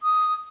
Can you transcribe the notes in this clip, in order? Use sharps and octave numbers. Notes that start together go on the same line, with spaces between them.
D#6